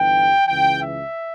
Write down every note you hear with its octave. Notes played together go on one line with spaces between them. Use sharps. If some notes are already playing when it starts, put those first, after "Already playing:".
Already playing: G1 G2 E3 G5
C#2 C#3 E3 G5
E5